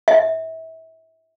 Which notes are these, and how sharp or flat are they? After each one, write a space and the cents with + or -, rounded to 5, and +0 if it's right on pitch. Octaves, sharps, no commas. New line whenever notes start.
E5 -30